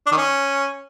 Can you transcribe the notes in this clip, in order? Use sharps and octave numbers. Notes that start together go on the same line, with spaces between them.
D4
D#3
C#4